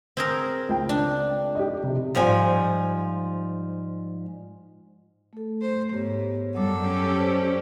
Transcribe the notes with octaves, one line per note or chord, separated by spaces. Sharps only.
C4 G#4 A#4
C#2 G5
D4
G4 D#5
C3
G#2 F3 G3 G#5
A3 A4
C5
G#2 B3 G4 C#5
F#2 G3 A4 F#5 D6
C#4 G4
C5 D5